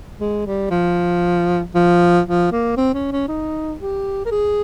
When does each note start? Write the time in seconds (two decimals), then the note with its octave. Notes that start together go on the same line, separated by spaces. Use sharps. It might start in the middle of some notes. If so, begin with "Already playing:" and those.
0.21 G#3
0.46 G3
0.71 F3
1.75 F3
2.26 F3
2.52 A#3
2.77 C4
2.94 C#4
3.12 C#4
3.29 D#4
3.80 G4
4.25 A#4
4.32 G#4